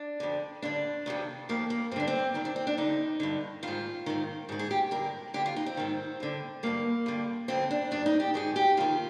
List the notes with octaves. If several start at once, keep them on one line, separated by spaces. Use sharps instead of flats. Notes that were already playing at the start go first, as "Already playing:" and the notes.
Already playing: D4
F2 D3
G2 D3 D4
F2 C3 D#3
F2 D#3 A#3
A#3
G2 D3 C4 D4
C4
G#2 D#3 D#4
D4
C4
D4
G2 D3 D#4
G2 D3
G#2 D#3 F4
G#2 D#3
G#2 D#3
G#4
G4
G2 D3 A#4
F2 D3 G4
F4
D#4
C4
G#2 D#3
G2 D3
G2 D3 A#3
G2 D3
F2 D3 C4
D4
G2 D#3 D4
D#4
G4
G#2 D#3 G#4
G4
F2 D#3 F4